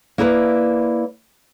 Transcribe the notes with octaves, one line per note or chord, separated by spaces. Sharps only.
A#3 E4 A#4 B4 D5